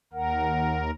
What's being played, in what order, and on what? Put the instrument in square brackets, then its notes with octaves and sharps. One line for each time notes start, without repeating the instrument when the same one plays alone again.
[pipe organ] D#2 A#4 [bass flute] F#5